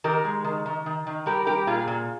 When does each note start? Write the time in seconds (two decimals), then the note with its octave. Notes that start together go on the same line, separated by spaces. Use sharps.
0.04 D#3 G4 A#4
0.25 G#3
0.44 D#3
0.66 D#3
0.86 D#3
1.07 D#3
1.26 G3 G4 A#4
1.47 G3 G4 A#4
1.67 A#2 F4 G#4
1.88 A#2